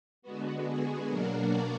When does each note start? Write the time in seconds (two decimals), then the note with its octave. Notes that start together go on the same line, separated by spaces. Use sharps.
0.22 D3 G#3 B3 F#4
0.66 G#4
1.09 B2 F#3 A#3 D4 F#4 A#4
1.38 A#4 D5